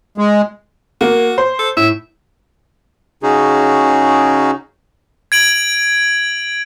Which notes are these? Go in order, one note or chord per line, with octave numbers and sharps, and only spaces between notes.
G#3
A#3 F#4
C5
A4
A2 E5
C#3 C#4 D#4 F#4 G#4
G#6 D7 F#7